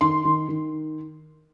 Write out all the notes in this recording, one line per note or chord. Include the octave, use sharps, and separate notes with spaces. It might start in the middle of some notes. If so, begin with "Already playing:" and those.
D#3 C6
D#3
D#3